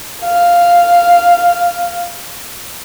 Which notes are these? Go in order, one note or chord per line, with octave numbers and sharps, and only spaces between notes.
F5